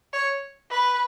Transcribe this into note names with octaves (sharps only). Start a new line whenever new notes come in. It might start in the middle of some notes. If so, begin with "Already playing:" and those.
C#5
B4